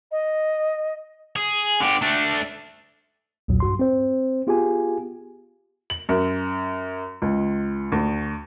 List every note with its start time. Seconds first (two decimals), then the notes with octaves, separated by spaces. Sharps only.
0.11 D#5
1.36 G#4
1.80 D3 G4
2.02 A3 D4
3.48 B1 E2 A#2 F#3
3.60 G2 F#4 C6
3.79 C4 C5
4.47 B3 F4 G4 G#4 G#5
5.90 F#7
6.09 F#2
7.22 C#2
7.92 D2